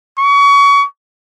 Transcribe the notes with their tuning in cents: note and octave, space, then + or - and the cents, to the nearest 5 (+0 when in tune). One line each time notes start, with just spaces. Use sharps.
C#6 +30